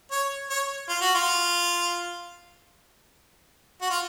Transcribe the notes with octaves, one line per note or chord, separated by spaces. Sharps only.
C#5
C#5
F4
F#4
F4
F#4
F4